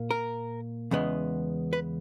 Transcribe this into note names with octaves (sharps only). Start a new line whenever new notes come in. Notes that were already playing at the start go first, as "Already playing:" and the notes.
Already playing: A#2 A#3
A#4
E2 C#3 G#3 B3
B4